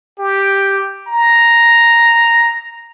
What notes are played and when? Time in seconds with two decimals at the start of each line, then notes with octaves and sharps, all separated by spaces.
0.19 G4
1.07 A#5